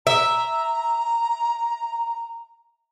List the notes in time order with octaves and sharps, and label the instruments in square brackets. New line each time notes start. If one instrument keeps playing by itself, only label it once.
[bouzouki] E5 [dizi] A#5